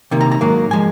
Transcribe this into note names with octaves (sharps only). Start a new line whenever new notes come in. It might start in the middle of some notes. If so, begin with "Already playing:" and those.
C3 D#3 A#3
A#5
A#5
G#2 F#3 A#3
F3 G#3 G#5